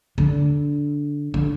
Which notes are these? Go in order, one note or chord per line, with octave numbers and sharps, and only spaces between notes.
D3
D3